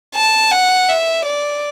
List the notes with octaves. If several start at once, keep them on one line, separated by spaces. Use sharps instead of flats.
A5
F#5
E5
D5